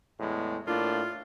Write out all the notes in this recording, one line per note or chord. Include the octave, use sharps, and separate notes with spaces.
E2 A2 G#3
A2 A#3 D4 F4